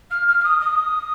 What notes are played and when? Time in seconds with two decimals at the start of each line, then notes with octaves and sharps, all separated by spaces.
0.10 F6
0.27 F6
0.40 F6
0.43 D#6
0.60 D#6